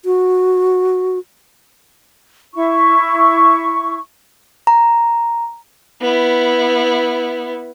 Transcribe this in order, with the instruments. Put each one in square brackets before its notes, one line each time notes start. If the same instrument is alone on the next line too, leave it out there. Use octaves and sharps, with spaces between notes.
[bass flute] F#4
[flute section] E4 C#6
[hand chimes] A#5
[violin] B3 E4